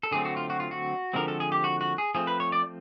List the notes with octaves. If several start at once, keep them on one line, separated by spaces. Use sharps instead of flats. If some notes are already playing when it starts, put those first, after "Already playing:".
A4
D3 F#3 A3 C4 G#4
F#4
F4
F#4
F4
F#4
D3 F3 G#3 C4 A#4
A4
G#4
G4
F#4
F#4
G#4
F3 A3 C4 G#4
B4
C#5
D5